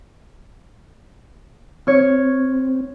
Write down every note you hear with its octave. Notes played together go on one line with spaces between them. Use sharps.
C4 C#5 F6